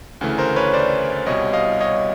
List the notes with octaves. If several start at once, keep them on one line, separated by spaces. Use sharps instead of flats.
D2 C#3 E3 A3
A#4 C5
B4 C#5
C5 D5
C2 B2 G3 C#5 D#5
D#5 F5
C#5 D#5